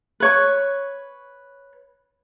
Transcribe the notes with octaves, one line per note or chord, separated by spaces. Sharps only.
B4 C#5 C#6